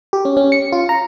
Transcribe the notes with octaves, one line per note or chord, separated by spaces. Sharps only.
G4
C#4
C#4
C#7
F4
A#5